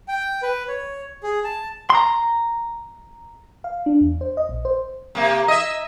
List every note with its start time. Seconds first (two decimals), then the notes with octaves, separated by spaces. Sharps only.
0.08 G5
0.42 B4
0.68 C#5
1.23 G#4
1.44 A5
1.90 A#5 C6
3.64 F5
3.86 D4
4.01 E2
4.21 C5
4.37 D#5
4.49 A#1
4.65 C5
5.15 C3 A#3
5.48 D#5 E5